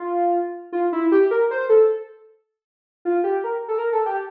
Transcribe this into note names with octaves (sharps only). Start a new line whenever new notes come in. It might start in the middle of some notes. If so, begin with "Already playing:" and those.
Already playing: F4
F4
E4
G4
A#4
C5
A4
F4
G4
A#4
A4
A#4
A4
G4